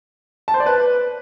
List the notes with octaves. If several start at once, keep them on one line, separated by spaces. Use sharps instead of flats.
A5
C5
D5
B4